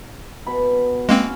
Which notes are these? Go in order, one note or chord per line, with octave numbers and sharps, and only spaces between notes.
B2 B5
G#3 A#3 C4 C#4